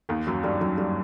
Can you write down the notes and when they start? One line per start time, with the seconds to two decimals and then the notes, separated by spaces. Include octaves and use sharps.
0.09 D#2 D#3
0.27 F#2 F#3
0.43 G2 G3
0.61 F#2 F#3
0.78 G2 G3